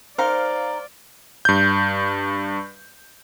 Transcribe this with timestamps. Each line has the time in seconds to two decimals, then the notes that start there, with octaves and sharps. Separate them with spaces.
0.18 D#4 A#4 C5 D5 F5 F6
1.45 G2 G6